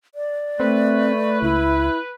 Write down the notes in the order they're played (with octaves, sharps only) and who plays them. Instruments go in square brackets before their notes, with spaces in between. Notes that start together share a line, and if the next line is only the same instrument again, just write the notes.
[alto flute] D5
[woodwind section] A3 [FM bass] C4 [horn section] B4
[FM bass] C#2 [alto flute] E4